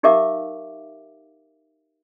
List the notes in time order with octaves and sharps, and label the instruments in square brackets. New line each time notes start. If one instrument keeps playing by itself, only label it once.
[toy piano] D#4 G4 A#4 E5 F5 D6